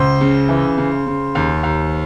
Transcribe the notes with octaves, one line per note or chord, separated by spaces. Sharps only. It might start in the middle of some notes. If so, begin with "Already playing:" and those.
Already playing: C#2 C5
C#3
E3
C#3
C#3
D#2
D#2